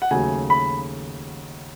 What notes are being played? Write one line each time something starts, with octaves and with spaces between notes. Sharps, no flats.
F#5
D#2 C#3 F#3 A3 G#5
B5